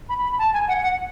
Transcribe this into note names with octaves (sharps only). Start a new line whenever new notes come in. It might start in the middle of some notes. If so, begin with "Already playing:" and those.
B5
B5
A5
G#5
F#5
F#5